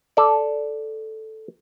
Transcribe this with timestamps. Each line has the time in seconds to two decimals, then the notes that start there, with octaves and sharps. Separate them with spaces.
0.17 A4 D5